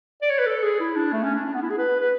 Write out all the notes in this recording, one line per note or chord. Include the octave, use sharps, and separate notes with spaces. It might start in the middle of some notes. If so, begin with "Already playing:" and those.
D5
C#5
B4
A4
G#4
E4
D4
A3
C#4
D4
D4
B3
E4
G#4
B4
B4